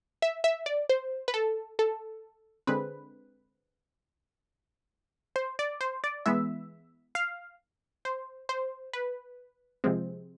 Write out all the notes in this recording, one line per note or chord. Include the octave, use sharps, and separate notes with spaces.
E5
E5
D5
C5
B4
A4
A4
D3 G#3 C4 B4
C5
D5
C5
D5
E3 G#3 B3 E5
F5
C5
C5
B4
C3 F3 G#3 C4